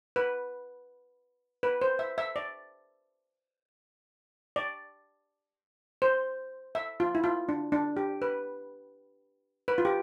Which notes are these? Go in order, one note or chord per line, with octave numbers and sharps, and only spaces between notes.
B4
B4
C5
E5
E5
D5
D5
C5
E5
F4
E4
F4
D4
D4
G4
B4
B4
F4
G4